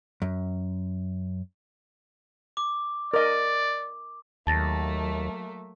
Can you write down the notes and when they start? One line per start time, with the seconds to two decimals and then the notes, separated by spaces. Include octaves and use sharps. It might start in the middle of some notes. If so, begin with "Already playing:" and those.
0.22 F#2
2.57 D6
3.14 A#4 D5 D#5
4.47 D#2 F#3 A3 A#3 A5 A6 A#6